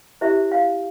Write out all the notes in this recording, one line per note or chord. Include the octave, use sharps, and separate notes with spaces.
E4 G4 C5 E5
F5